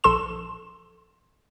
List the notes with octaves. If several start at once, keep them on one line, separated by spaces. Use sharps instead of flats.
A#1 A4 C6 E7